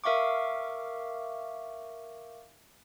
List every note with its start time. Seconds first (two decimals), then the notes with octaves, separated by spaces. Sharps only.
0.04 A#4 E5 F5 C#6 D6